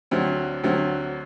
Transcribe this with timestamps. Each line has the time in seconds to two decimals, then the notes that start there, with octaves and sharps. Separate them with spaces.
0.11 D2 D3 F#3 C4
0.64 D2 D3 F#3 C4